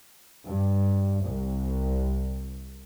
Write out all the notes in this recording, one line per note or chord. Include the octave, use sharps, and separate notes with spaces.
G2
C2